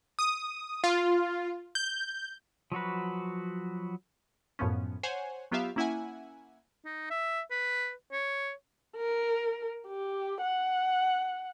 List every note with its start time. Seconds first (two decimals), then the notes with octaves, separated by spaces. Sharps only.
0.19 D#6
0.84 F4
1.75 G6
2.72 F3 F#3 F#4 B4
4.59 F#2 A2 F3 B3 C#4
5.03 C5 C#5 F#5 G#5
5.51 F#3 B3 F4 G4 E5 F5
5.76 A#3 C#4 E4 E5 F#5 G#5
6.85 D#4
7.10 E5
7.51 B4
8.12 C#5
8.97 A#4
9.88 G4
10.42 F#5